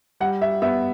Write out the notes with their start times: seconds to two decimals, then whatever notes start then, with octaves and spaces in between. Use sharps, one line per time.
0.20 G3 F#5
0.42 E5
0.62 B3 E5